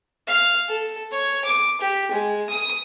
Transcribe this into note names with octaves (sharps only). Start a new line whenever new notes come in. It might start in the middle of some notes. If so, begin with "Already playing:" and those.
F5
A4
C#5
D6
G4
G#3
D#6